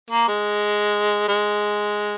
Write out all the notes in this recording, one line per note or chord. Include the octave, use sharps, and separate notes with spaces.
A#3
G#3
G#3